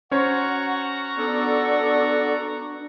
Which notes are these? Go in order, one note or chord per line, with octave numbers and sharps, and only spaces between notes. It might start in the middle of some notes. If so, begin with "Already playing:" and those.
C#4 F#4 C5 C#5 F#5 A#5 C#6
B3 D4 A4 D5